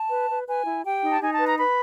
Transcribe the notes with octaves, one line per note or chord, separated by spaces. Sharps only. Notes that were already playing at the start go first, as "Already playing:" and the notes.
Already playing: A5
B4
B4
B4 G#5
E4
G4 G5
D#4
A5
D#4 G#5
A5
B4
A#5
B4 B5